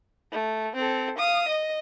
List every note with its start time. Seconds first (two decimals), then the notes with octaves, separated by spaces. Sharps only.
0.31 A3
0.76 C4 A4
1.18 F5 D#6
1.48 D#5